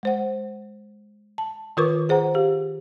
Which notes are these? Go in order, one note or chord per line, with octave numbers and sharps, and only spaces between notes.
G#3 C5 F#5
A5
D#3 F4 A#4 B4 C#6 D6
G#4 C5 F#5 A#5
G4 F5